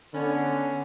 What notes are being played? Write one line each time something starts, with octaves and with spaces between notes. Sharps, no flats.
D3 B3 C#4